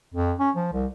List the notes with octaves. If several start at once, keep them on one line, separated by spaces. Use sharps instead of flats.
F2
C#4
F3
C2